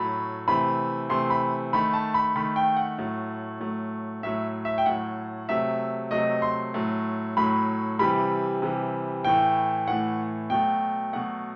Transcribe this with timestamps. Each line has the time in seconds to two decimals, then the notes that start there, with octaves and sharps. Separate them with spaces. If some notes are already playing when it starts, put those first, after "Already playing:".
Already playing: A2 F#3 A3 B5
0.48 C3 E3 A3 B5
1.09 C3 E3 A3 C6
1.30 B5
1.73 D#3 A3 B5
1.93 A5
2.14 B5
2.36 D#3 A3 B5
2.56 G5
2.77 F#5
2.98 A2 F#3 A3
3.60 A2 F#3 A3
4.23 A2 F#3 A3 E5
4.65 E5
4.78 G5
4.86 A2 F#3 A3 F#5
5.49 C3 F#3 A3 E5
6.11 C3 F#3 A3 D#5
6.42 C6
6.74 A2 F#3 A3
7.37 A2 F#3 A3 B5
7.99 C3 E3 G3 B5
8.62 C3 E3 G3
9.24 A2 E3 A3 G5
9.87 A2 E3 A3 F#5
10.50 B2 F#3 A3 G5
11.13 B2 F#3 A3 F#5